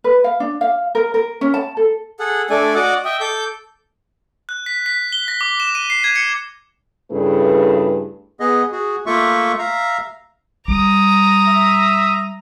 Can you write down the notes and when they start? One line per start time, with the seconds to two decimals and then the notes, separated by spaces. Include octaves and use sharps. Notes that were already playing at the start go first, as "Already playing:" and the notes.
0.04 B4
0.24 F5
0.40 D4
0.61 F5
0.95 A#4
1.14 A#4
1.41 C#4
1.54 A5
1.77 A4
2.19 G#4 A4 F#5
2.50 A3 D4 A4 D5 G#5
2.75 F#4 D5 D#5 F#5 D6
3.05 D#5 E5 G5
3.21 A4 D6 G6
4.49 F#6
4.66 B6
4.86 B6
5.12 G7
5.28 A#6
5.41 D6
5.60 E7
5.75 D#7
5.90 C7
6.04 G#6
6.16 C#7
7.11 G2 C#3 A3 E4 G#4 B4
8.40 B3 G#4 D#5
8.72 F#4 G#4
9.06 A3 A#3 F4 E5 C#6
9.59 E5 F5 A#5
10.68 G3 A#5 D#6
11.48 E5